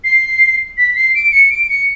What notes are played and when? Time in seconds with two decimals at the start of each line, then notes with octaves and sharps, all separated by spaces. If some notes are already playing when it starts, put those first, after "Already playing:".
0.04 C7
0.78 B6
0.95 C7
1.15 D7
1.32 C#7
1.50 D7
1.69 C#7